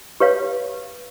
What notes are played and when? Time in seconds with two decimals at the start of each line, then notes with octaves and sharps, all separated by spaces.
0.20 G4 B4 C#5 F5